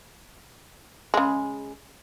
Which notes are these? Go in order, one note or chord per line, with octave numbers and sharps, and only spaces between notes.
C#3 G#3